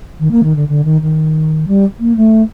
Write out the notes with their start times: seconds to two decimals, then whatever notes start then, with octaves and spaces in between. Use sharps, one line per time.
0.20 D#3
0.31 A#3
0.44 D#3
0.56 D3
0.69 D3
0.84 D#3
1.02 D#3
1.68 G3
2.00 A#3
2.17 A3